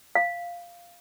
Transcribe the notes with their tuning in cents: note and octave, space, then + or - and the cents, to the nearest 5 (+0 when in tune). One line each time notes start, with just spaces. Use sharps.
F5 -5